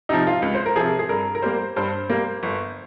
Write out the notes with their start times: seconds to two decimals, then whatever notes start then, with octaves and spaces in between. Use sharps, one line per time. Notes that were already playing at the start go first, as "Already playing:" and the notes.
0.09 C3 F3 D#4
0.27 F4
0.42 C#2
0.55 C5
0.66 A#4
0.76 C3 F3 G#4
0.99 G#4
1.09 G2 A#4
1.35 A#4
1.42 G3 A#3 C5
1.76 G2 C5
2.09 G3 A#3
2.43 G1